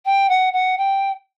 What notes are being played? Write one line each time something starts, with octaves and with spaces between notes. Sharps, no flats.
G5
F#5
F#5
G5